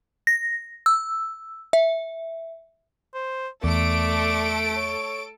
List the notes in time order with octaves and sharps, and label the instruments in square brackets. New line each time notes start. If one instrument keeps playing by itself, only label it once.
[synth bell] A#6
E6
E5
[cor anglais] C5
[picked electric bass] E2 [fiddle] A3 [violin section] A4 D7 [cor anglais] D5
[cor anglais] C#5